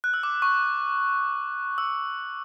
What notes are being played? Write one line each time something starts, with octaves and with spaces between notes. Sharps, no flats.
F#6
E6
D6
C#6
E6